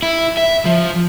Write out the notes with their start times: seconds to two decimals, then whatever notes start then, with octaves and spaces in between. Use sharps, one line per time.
0.03 E4
0.37 E5
0.65 F3